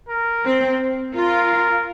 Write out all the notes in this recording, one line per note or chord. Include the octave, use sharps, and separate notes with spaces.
A#4
C4
F4 A#4